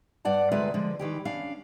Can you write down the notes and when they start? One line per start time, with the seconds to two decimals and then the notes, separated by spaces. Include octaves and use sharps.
0.25 G2 D5 F#5 A5
0.52 D2 C3 G#3 F4 B4 E5
0.74 D3 F3 G#3
0.99 D#3 E3 G4
1.25 C#4 D4 F5